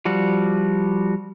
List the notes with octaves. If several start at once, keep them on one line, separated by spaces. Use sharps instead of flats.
F3 G3 F#4